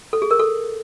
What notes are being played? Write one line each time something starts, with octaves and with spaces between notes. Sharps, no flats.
A4
G#4
A#4
A4